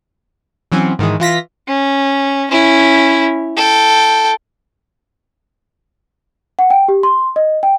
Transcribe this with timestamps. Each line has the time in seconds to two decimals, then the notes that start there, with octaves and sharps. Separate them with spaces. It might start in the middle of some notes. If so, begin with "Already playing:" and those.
0.72 E3 F#3 C4 C#4
0.99 G#2 D#3 E3 G#3
1.20 E3 F4 A#6 B6
1.68 C#4
2.51 C#4 E4
3.56 A4 G5
6.59 F#5
6.70 G5
6.88 G4
7.03 C6
7.36 D#5
7.63 G5